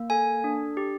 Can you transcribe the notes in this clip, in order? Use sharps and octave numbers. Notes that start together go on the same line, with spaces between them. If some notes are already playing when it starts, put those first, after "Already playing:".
Already playing: A#3
A4 G#5
D4
G4